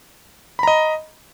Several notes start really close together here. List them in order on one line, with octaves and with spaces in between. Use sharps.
B5 A#5 D#5